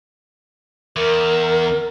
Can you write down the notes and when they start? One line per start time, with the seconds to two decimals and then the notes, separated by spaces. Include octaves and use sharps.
0.96 E2 A#4